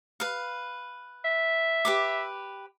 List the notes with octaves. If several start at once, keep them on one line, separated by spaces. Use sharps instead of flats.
B4 F5
E5
G4 B4 D6